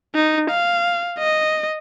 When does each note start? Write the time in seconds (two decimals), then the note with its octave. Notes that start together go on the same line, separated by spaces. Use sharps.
0.15 D#4
0.50 F5
1.19 D#5